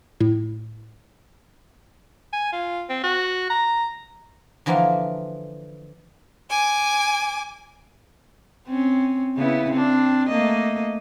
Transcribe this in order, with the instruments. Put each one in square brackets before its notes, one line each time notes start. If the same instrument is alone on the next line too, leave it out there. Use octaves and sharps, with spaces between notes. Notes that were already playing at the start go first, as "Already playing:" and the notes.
[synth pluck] A2
[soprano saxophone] G#5
F4
C4
F#4
A#5
[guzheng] D3 E3 F3 A#3 A#4 F5
[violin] G#5 D6
[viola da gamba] C4 C#4
C#3 B3 E4
C4 D4
A3 A#3 D#5